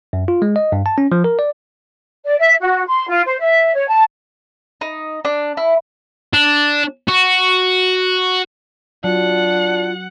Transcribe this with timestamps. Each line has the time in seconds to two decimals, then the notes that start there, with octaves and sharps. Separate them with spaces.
0.13 F#2
0.28 F4
0.42 G#3
0.56 D#5
0.72 G2
0.86 A5
0.98 C#4
1.12 F3
1.24 A#4
1.39 D5
2.25 D5
2.39 E5
2.60 F#4
2.87 C6
3.08 F4
3.26 C5
3.39 E5
3.75 C#5
3.88 A5
4.81 D#4
5.25 D4
5.57 E4
6.34 D4
7.08 F#4
9.04 F#3 D4 F4 F#5